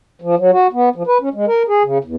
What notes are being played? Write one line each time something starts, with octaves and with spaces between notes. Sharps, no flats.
F3
F#3
F#4
B3
F3
B4
C#4
G#3
A#4
G#4
C#3
E2